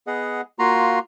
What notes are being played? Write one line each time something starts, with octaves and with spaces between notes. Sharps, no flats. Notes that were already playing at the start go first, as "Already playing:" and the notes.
B3 G#4 D#5 F#5
A#3 F4 F#4 A#5 C6